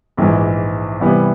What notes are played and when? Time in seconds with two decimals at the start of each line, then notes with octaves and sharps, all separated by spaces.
0.17 A#1 G#2 E3
1.00 C3 E3 G3 B3